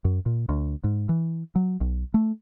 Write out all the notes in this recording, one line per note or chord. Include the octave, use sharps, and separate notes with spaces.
F#2
A#2
D2
G#2
E3
F#3
B1
A3